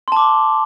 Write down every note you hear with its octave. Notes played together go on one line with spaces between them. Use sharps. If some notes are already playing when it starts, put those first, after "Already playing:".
A5 C6 D6